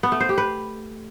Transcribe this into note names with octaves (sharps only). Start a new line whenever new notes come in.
B3
A3
C5
G4
B4